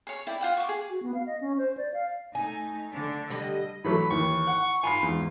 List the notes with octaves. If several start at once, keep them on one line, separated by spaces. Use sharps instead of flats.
G#4 C#5
E4 D5 G5
F4 F#5 G5
C#6 D6
G#4
F#4
B3
F5
D#5
C#4
C5
D5
F5
A3 D#4 G#5
D3 A3 D4
D3 G3 D#5
E3 F#3 A3 B5
D#2 E3 C#6
F#5
F4 G#5 B5 C7
E2 G#2